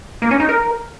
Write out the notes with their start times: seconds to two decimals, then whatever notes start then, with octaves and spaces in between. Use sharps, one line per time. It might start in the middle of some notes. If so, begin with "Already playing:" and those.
0.22 A#3
0.31 C#4
0.40 D#4
0.49 A#4